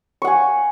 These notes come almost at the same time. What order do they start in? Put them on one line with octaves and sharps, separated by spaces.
C#6 F#5 G#5